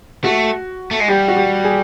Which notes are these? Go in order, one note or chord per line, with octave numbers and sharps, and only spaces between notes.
A3 F#4
A3
G#3
G3 G4
F#4
G4
G#4